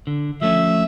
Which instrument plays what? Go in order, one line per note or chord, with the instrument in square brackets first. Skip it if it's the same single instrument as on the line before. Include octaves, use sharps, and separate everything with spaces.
[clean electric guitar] D3
[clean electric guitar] F3 A3 C#4 [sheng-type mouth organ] E5